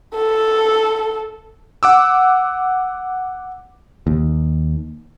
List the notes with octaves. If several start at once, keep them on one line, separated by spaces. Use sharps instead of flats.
A4
F#5 D6 E6
D#2